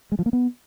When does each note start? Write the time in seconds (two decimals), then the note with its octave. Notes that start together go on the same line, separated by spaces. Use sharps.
0.12 G#3
0.19 F3
0.26 A#3
0.33 B3